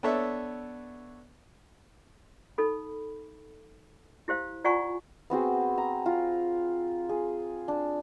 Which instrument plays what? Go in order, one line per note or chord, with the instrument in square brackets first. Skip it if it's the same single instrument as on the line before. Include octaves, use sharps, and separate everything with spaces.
[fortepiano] B3 D4 A4 C#5 E5
[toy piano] D#4 A4 B5
E4 G4 C5 F5
F4 D5 F#5 G#5 A#5 C#6
[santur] B3 C4 F#4 G#4
A#5
F4
G#4
D4